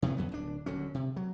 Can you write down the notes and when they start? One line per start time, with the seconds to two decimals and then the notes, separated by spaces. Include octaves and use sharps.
0.02 C3 D#3 E3 B3
0.16 E2 C#3 F#3 B3
0.32 D1 D4
0.66 D#1 D3 F#3 C#4
0.94 C3
1.16 F#3